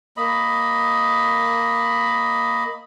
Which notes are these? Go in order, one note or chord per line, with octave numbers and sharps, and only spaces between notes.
A#3 D#5 B5